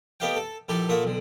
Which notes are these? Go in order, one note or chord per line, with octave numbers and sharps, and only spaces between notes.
A3 B3 G4 D#5 F5 G5
A4
A#1 E4 G4 A4 G#5
A#2 A3 A#3 E5 F#5 D#6
B1 D3